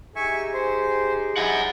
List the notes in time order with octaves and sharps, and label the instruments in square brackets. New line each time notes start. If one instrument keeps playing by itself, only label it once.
[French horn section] D#4 G4 G#4 [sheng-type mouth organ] E5 G#5 C#6
[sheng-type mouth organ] C5
[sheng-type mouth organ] E4 D#5 [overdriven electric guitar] F#5 G#5